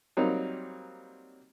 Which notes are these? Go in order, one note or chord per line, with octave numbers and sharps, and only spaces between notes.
F#3 G3 A#3 C4 D#4